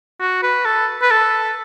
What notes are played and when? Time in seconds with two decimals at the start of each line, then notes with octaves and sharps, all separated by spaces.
0.20 F#4
0.43 B4
0.65 A4
1.02 B4
1.11 A4